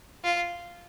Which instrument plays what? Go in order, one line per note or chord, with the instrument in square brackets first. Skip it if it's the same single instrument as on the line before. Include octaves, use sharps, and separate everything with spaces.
[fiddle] F4